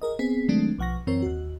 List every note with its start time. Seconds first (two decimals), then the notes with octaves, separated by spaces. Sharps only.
0.02 G#4 A#4 D#5
0.19 B3 C4 G#4 B6
0.48 D#3 F#3 G#3 A3 C4 D4
0.79 B1 F3 F#5 C#6 A#6
1.07 F#2 E3 C4 A#4 C#5
1.22 D#2 F#4